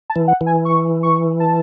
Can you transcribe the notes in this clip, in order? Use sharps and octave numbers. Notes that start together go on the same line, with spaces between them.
A5
E3
F#5
E3
G#5
C#6
C#6
A5